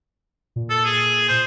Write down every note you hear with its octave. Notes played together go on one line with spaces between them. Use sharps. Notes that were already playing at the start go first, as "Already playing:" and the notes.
A#2
A4
G#4
C5